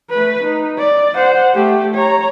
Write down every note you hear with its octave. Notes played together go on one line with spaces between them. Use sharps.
A3 B4
D#4
D5
C5 F#5
A3 G4
C#5 A#5